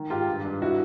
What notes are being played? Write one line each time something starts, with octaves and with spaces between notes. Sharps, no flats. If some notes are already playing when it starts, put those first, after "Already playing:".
Already playing: D#3
G#2 F4 G4
G2
G2
E4 F#4